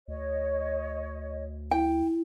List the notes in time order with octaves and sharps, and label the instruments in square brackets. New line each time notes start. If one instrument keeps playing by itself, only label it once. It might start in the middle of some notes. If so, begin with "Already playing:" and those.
[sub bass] D2 [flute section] C#5 D#5
[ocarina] E4 [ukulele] G5